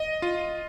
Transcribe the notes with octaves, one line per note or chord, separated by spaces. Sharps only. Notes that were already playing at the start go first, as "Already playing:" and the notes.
Already playing: D#5
F4